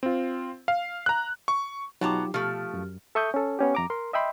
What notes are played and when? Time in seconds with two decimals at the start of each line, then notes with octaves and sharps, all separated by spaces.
0.03 C4 F4
0.68 F5
1.06 A#5 F#6
1.48 C#6
2.01 B2 F#3 D#4 F4 G4 A5 A#5 D6
2.34 B2 F3 A3 G4 F6
2.74 F#2
3.15 A4 E5 C#6 D#6 G6
3.34 C#4 A4
3.59 B3 C#4 G4
3.75 F2 A#5 D6
3.90 A#4 C6
4.13 D#5 E5 G5 B5 C6